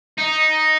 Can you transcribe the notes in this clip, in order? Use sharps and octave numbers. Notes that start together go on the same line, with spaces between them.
D#4